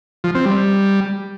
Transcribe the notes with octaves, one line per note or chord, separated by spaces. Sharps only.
F3
C4
G3